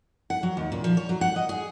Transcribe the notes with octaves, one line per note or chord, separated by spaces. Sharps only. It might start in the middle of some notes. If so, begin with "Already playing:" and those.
F#5
F#3
D#2
A#2
F3
C#5
F#3
F#5
D#5
G#4